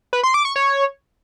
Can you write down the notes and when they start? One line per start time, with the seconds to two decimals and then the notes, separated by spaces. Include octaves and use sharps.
0.13 B4
0.23 C6
0.34 D6
0.45 C#6
0.56 C#5